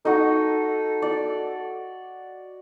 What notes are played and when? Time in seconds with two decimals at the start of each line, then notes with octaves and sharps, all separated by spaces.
0.05 D#4 F#4 A4
1.02 D5